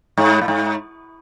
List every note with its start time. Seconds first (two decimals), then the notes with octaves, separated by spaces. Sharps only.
0.17 G#2
0.41 A2
0.48 G#2